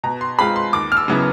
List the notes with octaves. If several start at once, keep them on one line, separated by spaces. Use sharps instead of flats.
B2 A#5
C6
G#3 C4 F4 B5
C6
D#2 D6
F6
E6
C#3 F#3 B3 E4